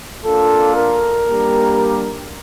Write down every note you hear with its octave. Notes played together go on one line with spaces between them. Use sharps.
A#3 D4 F4 A4
A#4
G3 A#3 D4 G4